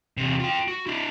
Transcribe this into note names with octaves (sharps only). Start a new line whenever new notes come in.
E2 C3
F4 G5
F#4
D4 E4